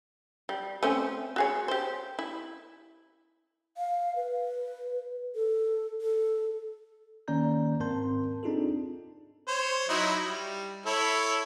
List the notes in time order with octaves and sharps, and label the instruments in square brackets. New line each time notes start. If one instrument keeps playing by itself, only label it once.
[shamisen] G3
A3 C4 C#4
F#4 G#4 C#5
G4 C5
E4
[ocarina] F5
B4
A4
A4
[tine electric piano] D#3 A#3 C#4 D5 A#5 G6
G#2 C4 A#4 A5 C6 G6
C4 D4 D#4 F4 G#4 A4
[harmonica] C5 C#5
F#3 D#4 E4
G3
E4 A4 C#5